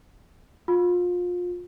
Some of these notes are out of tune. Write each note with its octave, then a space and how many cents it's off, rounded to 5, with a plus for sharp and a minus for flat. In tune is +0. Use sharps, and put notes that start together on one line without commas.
F4 +30